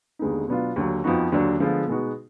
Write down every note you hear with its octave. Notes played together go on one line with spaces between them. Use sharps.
D#2 D3 G#3 B3 D#4
B2 F#3 B3 D4 F4
D#2 D3 F#3
F2 F3 B3 D#4 F#4
D#2 D3 F#3 D4
D3 F3 G#3 B3 F4
B2 G#3 B3 D#4 F#4